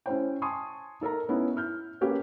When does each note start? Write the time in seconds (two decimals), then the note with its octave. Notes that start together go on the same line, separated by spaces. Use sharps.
0.06 C#4 E4 C5 G5
0.42 G#5 A5 C6 C#6 D#6
1.01 D#4 A4 A#4 A#5
1.29 B3 C#4 D#4 E4
1.56 E4 F6 G6
2.01 A#3 C#4 G4 A4 B4